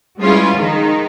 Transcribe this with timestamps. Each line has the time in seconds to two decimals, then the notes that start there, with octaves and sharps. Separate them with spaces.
0.21 G3 G#3 B3 C#4 E4 F4
0.56 D#3 G#3 D#4